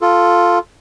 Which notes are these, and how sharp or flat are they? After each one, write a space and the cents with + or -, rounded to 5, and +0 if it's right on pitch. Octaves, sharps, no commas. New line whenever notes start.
F4 +0 A4 +0